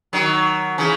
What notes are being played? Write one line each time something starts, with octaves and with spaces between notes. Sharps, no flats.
D#3 F#3
C#3 E3